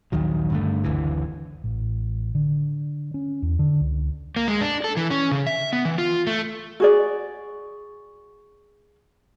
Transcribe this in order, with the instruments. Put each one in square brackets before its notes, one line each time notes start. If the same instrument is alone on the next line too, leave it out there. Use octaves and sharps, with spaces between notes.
[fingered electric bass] A#1 D#2 D#3 F#3
G2 D3 A3
F#1 D2 D3 E3
A1
D3
C#4
E2
D3
C#2
[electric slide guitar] A#3
G#3
D4
A4
E3
C#4
C#3
E5
B3
E3
F4
A3
[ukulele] F#4 G#4 D5